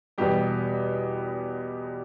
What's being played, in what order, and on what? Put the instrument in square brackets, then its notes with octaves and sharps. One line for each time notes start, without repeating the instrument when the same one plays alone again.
[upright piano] E2 B2 G3 G4